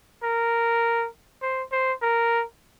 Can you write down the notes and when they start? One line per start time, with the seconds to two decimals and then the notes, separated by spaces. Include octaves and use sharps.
0.23 A#4
1.42 C5
1.72 C5
2.02 A#4